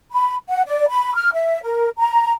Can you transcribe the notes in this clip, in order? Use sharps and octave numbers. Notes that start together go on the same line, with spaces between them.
B5
F#5
D5
B5
F6
E5
A#4
A#5